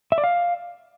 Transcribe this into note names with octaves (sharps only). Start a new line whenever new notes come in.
E5
D5
F5